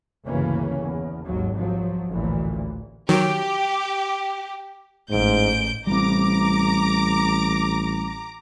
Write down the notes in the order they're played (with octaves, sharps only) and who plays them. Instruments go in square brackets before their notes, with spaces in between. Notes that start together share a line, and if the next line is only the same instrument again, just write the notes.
[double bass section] G1 D2 C#3 E3 A#3 C#4
E2
G#1 D#2 F#3
C2 F3 F#3
A1 D2 A#2 E3
[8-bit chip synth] D#3 F#3 [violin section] G4
[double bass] A1 [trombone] G#2 [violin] G6 D7
[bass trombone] A1 [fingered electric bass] G3 C4 [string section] A#5 D6